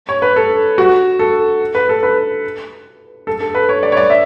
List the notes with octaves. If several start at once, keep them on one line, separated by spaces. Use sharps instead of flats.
C#5
B4
A4
F#4
A4
B4
A4
B4
A4
A4
B4
C#5
D5
C#5
D5
E5